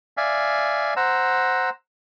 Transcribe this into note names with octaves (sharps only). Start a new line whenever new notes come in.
D5 E5 F5 G#5
C5 F#5 A#5 E6